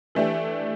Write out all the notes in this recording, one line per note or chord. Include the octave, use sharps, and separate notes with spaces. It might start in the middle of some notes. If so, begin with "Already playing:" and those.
E3 A3 D4 G4